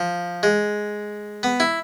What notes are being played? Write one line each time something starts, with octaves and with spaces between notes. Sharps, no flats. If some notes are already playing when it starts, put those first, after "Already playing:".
Already playing: F3
G#3
B3
E4